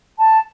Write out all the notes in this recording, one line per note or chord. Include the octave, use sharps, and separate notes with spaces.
A5